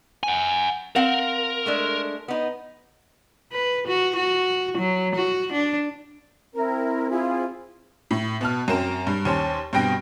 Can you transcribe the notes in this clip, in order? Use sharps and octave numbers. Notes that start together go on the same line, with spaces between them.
F#5 G#5
C4 A#4 F5 F#5
G#3 A3 D4
B3 D#4
B4
F#4
F#4
F#3
F#4
D4
C4 E4 A#4
E4 F4 G#4
A2
B2 A5 F6
F#2 C4 A#4 E7
G2
D#2 C#4 C5 A5
G2 B2 C4 G5 A#6 D7